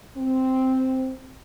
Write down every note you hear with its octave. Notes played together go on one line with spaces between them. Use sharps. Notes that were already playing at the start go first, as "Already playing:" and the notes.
C4